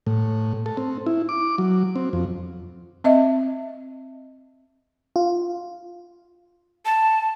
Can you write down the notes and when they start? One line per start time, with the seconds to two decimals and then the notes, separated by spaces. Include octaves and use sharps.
0.06 A2
0.66 A4
0.77 C4
1.06 E4
1.29 D6
1.58 F#3
1.96 C4
2.13 F2
3.04 C4 D#5 E5
5.16 F4
6.85 A5